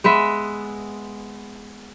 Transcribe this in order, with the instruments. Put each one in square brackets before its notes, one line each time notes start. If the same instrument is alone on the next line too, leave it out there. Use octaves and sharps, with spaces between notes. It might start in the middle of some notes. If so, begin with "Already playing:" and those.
[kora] G#3 B3 B4 E5